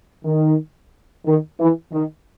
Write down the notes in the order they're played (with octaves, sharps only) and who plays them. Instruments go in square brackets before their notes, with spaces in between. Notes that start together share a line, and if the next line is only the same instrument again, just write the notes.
[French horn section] D#3
D#3
E3
D#3